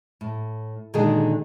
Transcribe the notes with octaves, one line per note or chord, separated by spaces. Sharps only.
A2
A#2 D3 D#3 G#3 F#4 G#4